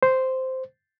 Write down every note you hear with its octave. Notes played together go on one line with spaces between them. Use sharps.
C5